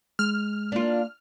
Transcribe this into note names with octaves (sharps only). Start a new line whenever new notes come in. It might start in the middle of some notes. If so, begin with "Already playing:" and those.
G#3 F6
A#3 D4 F4